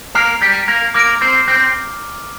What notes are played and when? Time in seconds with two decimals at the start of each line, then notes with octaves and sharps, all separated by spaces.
0.15 A#3 A#4 A#5 F6 C7
0.42 G3 G4
0.68 A#3 A#4
0.94 A#3 A#4 D6 F6 D7
1.21 C4 C5
1.48 C4 C5